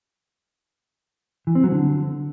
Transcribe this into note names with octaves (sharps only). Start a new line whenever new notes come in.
E3
C4
F#3
D3